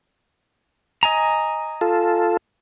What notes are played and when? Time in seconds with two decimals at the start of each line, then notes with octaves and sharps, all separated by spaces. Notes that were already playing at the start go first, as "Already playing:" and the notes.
1.03 D#5 G#5 A#5
1.81 F4 A4